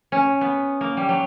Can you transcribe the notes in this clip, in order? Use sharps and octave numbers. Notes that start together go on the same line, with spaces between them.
C#4
B3
A#3
G3
F#3